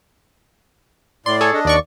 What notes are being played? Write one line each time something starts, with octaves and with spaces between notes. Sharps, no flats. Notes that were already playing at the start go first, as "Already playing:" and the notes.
A2 D5 C6
G#4 A4 C#5
D4 D#5
D#2 D5 C#6